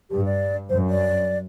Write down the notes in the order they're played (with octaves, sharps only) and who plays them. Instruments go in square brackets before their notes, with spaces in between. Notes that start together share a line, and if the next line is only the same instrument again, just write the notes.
[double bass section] G2 [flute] G4
[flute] D5
[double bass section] F#2 [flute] C5
[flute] D5